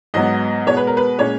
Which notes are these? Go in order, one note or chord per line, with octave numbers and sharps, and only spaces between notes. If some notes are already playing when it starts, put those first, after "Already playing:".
G#2 F#3 B3 D#5
B2 G#3 B3 C#5
B4
A#4
B4
A#2 G#3 C#4 C#5